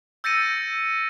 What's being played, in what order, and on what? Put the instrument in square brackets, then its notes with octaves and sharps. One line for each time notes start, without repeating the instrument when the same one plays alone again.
[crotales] E6 G6 A6 A#6 C#7 D#7